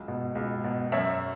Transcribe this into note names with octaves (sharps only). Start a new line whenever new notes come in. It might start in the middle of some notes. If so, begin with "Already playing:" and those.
Already playing: C#2 F#3
B2
C#2
B2
F#2 C#5 E5